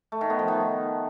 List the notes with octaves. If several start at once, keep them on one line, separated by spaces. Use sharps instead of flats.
A3
D#3
B3
F3
D#3